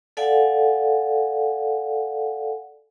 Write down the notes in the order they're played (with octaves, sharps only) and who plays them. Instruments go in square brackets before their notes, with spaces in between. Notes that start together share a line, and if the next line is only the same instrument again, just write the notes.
[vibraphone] A4 D5 F5 F#5 G#5